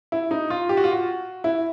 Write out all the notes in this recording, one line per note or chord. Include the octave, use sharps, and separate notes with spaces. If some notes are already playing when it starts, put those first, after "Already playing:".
E4
D#4
F4
G4
F#4
F4
F#4
E4